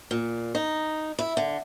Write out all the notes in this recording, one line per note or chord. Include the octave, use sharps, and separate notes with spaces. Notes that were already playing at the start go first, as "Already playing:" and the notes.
A#2
D#4
E4
D3